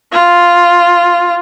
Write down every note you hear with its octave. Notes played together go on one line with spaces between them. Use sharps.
F4